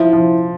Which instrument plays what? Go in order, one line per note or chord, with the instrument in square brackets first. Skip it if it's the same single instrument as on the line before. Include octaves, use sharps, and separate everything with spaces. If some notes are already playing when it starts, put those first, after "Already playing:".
Already playing: [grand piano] F3 [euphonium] E4
[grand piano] F3